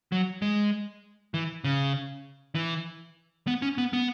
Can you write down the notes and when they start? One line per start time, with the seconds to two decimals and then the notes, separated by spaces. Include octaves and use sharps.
0.12 F#3
0.42 G#3
1.34 E3
1.64 C#3
2.55 E3
3.47 B3
3.62 C#4
3.78 B3
3.93 B3